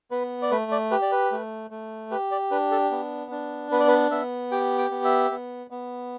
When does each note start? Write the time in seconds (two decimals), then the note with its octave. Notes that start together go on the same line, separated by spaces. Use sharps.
0.11 B3 B4
0.42 D5
0.51 A3 B4
0.71 D5
0.91 G4 B4
1.02 D5
1.12 B4
1.32 A3
1.71 A3
2.11 G4 B4
2.31 D5
2.51 D4 B4
2.71 A4
2.91 B3
3.31 D4
3.72 B3 B4
3.80 D5
3.88 B4
4.11 B3 E5
4.52 G4 G5
4.78 G5
4.91 B3
5.05 E5
5.31 B3
5.71 B3